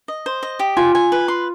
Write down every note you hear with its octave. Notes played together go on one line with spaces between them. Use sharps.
D#5
C5
D#5
G4
F4 G#5
G#5
B4
C6